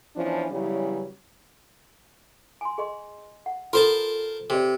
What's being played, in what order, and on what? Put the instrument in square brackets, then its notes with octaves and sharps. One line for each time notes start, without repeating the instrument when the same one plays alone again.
[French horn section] E2 E3 F3 C#4 D4
E2 C#3 E3 F#3 G3
[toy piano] G#5 C6
G#4 D#5 C6
F#5
[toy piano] F4 A4 C6 [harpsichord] A#4 C5 A5
[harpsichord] C3 [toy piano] G#4 C#5 D5